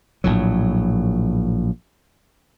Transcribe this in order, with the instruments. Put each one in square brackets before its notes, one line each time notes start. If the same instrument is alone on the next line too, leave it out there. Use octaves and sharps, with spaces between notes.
[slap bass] A#1 A2 F#3